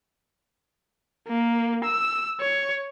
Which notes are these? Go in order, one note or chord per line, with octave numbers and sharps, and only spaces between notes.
A#3
E6
C#5